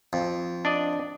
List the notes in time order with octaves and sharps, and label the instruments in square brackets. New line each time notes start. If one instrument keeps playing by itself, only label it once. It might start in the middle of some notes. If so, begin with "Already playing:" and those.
[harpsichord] F2
[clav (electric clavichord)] D4 D5 D#5